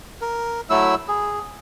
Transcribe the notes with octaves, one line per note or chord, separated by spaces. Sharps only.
A#4
F#3 A3 E4 E6
G#4